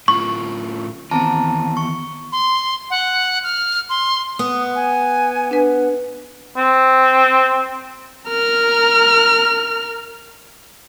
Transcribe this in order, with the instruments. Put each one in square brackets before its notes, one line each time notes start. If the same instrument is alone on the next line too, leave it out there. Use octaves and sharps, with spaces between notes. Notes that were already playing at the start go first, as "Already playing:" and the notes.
[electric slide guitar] A2 C#4 F4 [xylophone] C#6
[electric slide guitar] D#3 E3 B3 [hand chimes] C4 A5 A#5
[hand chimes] C#6
[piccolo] C6
F#5
F6
C6
[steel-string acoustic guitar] B3 [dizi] D#6
[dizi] G#5
[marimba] D4 B4
[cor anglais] C4
[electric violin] A#4 F6